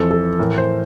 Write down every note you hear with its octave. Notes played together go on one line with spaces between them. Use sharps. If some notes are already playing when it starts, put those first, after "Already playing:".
Already playing: F2 E3 A4
A4
A2 E3 A#4
C5